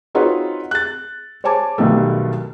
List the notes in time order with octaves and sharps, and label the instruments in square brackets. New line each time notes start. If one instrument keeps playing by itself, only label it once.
[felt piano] C4 D#4 F4 F#4 B4 C#5
F#6 A6
C5 C#5 G#5 A5 D6
B1 G2 B2 D#3 A3